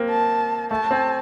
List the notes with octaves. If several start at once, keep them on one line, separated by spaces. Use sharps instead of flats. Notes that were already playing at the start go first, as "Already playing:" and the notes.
Already playing: A#3 C4
A5
A3 A5
C4